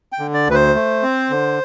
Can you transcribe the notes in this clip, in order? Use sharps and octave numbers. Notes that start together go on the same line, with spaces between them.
G5
D3
D5
D2 B4
C5
A3
C4
D3